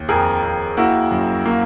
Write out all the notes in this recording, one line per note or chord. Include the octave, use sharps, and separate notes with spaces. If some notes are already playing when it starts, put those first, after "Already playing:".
Already playing: D#2
F2 G#4 A#4
F2
A#3 E4 F#4
F#2
A#3